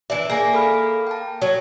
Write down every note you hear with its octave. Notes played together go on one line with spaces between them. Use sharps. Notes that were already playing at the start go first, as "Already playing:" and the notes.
E3 D4 E5
A#3 G#4 D5 G#5
A4 B5 F6
G5 A5
F#3